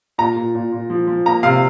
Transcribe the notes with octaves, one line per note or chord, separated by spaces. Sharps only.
A#2 A#5
A#2
A#2
A#2
F3
F3
A#3 A#5
C3 F5